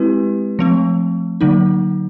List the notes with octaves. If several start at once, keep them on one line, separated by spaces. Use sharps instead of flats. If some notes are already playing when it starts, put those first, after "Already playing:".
Already playing: G#3 C4 E4 G4 B4
F3 A3 C4
D3 F#3 A#3 D#4